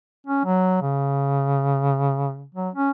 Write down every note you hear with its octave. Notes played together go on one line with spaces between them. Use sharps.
C#4
F#3
C#3
F#3
C#4